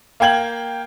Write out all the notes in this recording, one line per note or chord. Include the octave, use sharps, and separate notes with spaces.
A#3 F5 G5 G#6 F#7